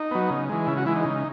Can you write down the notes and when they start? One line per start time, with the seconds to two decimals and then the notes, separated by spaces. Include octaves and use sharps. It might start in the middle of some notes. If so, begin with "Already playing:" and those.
Already playing: D#4
0.11 F#3 B3
0.30 C#3
0.49 E3 G#3
0.67 C#3 E4
0.77 F#4
0.86 E3 G#3 E4
0.95 D#4
1.05 C#3